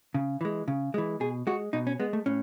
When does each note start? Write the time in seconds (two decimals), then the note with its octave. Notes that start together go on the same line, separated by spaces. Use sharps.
0.15 C#3
0.41 E3 G#3
0.68 C#3
0.94 E3 G#3
1.20 B2 G#4
1.47 G#3 F#4
1.73 B2 D#4
1.87 C#4
2.00 G#3 B3
2.13 A3
2.26 A2 C#4